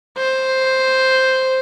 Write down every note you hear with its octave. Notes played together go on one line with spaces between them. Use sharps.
C5